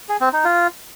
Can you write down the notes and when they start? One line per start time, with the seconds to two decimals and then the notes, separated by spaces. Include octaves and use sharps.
0.09 G#4
0.21 C4
0.33 D#4
0.45 F4